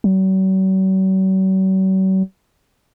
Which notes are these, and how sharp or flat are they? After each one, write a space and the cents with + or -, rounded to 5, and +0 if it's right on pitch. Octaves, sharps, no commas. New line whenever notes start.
F#3 +45